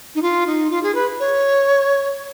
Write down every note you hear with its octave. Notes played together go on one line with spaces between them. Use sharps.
D#4
F4
D#4
F4
G#4
B4
C#5